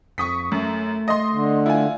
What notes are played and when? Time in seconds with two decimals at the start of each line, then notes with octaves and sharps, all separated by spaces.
0.18 F2 C#6 D#6 B6
0.52 F#2 A3
1.08 D#5 C6
1.33 D3
1.66 E4 F4 G#5